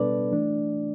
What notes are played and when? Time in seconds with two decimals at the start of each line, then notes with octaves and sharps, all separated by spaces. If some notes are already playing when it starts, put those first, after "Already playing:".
Already playing: B2 G3 B3 D4 A4 B4 D5
0.32 E3 A3 D4